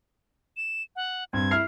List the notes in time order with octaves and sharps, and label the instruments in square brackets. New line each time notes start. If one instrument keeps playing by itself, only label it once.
[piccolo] E7
F#5
[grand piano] G2 C4 [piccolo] G#6
[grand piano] E4 F6 C7